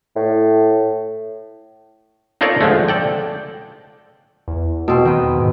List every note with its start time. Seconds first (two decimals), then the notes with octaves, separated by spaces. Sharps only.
0.16 A2
2.41 D#4 F4 A4 A#4 C#5 D5
2.61 D3 F3 G#3 A3
2.88 A4 D5 G5
4.48 E2
4.88 B2 C4
5.05 D#3 B4 G5
5.38 G#2